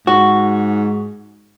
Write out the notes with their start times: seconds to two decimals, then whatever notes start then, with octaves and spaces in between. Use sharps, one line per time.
0.07 G#2 F#4